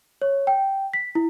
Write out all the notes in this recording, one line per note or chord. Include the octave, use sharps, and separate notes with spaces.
C#5
G5
B6
E4